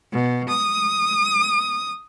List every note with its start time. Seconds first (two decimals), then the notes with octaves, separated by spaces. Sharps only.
0.10 B2
0.47 D#6